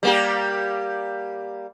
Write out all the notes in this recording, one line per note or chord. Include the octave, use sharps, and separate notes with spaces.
G3 A#3 G4